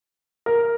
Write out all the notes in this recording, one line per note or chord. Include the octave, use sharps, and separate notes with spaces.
A#4